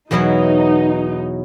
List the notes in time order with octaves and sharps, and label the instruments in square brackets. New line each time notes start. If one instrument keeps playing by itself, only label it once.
[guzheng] E2 B2 F#3 B3 E4 [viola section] D#4